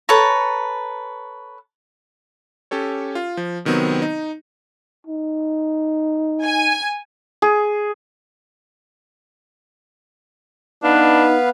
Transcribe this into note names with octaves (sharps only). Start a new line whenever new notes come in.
A4 B4 C#5 A#5
C#4 G4 A4 C#5
F4
F3
C3 D#3 F#3 B3 C4
D#4
D#4
G#5
G#4
B3 D4 D#4 B4 F5